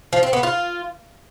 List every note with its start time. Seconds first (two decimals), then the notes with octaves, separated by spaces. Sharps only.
0.13 F3
0.23 C4
0.33 B3
0.43 F4